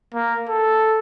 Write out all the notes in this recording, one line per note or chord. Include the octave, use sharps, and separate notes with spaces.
A#3
A4